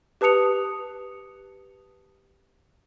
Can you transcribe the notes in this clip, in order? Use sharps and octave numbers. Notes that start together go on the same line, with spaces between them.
G4 B4 A5 D#6 C#7 F7